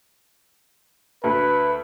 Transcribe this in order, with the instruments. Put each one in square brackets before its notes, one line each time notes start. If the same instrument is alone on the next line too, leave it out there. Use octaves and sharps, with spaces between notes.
[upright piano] D2 [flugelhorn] B4